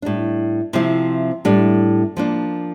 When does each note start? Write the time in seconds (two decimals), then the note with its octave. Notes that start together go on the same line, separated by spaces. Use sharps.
0.02 A2 G3 D4
0.73 C3 F3 C4 E4
1.45 A2 G3 D4
2.17 F3 A#3 D4